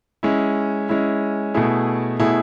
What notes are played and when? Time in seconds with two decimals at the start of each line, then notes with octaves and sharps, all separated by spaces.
0.23 G#3 C#4 E4
0.89 G#3 C#4 E4
1.54 B2 A3 E4 G#4
2.19 B2 A3 E4 G#4